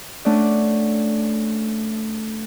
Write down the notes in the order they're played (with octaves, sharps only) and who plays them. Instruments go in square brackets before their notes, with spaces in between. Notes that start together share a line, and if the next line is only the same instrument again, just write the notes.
[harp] A3 C#4 D4 D5 F#5